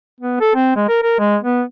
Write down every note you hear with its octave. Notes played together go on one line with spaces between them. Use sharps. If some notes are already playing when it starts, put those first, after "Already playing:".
B3
A4
C4
G#3
A#4
A#4
G#3
B3